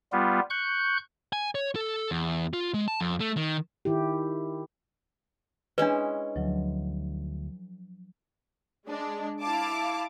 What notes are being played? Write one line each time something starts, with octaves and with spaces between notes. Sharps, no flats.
G3 B3 F4
C#6 F#6 G6
G#5
C#5
A4
E2
F4
G#3
A5
F2
A3
D#3
D#3 E4 G4
G#3 C#4 D4 E4 B4
D2 F3 F#3
G#3 D4
E4 F5 A5 D6